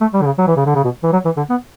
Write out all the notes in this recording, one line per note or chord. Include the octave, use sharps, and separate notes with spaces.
A3
G3
D3
C#3
F#3
E3
C#3
D3
C#3
B2
E3
F#3
E3
D3
B3